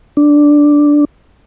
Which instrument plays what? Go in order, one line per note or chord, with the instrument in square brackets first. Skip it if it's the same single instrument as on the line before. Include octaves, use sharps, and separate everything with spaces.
[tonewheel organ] D4